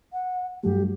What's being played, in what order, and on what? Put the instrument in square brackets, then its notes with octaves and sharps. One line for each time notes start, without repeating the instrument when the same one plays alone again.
[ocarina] F#5
[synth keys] G2 F#3 A3 [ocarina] G4